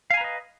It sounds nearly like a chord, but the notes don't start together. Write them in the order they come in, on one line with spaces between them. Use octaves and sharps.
F5 G#5 A#5 B4 D#5